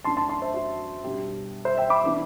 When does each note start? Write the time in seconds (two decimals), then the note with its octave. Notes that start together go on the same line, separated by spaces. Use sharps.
0.04 F#2 F#3 A3 D4 A5 C6
0.17 A5 C6
0.29 A5 C6
0.42 C5 E5
0.54 F#4
1.04 B2 G3 D4 G4
1.65 C5 E5
1.78 E5 G5
1.90 B5 D6
2.04 E3 B3 D4